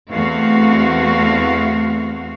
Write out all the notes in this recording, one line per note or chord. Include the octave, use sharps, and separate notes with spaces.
E2 A3 C4 F#4 F5